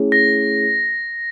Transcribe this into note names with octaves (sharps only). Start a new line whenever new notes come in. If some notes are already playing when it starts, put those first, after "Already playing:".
Already playing: A3 C#4 E4 G#4 C#5
A#6